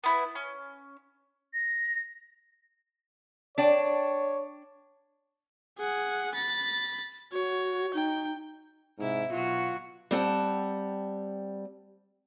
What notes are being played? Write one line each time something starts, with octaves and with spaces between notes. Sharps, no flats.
B3 E4 B4
C#4
A#6
D4 C#5 D5 G5
G#4 F#5
B5 A6
F#4 C#5
D#4 G5
G#2 C3 E4
B2 F#3 F4 F#4
G3 C4 F#5 A5